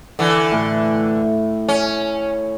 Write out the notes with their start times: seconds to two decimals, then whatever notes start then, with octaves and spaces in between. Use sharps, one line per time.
0.19 D3 E3
0.52 A2
1.68 C#4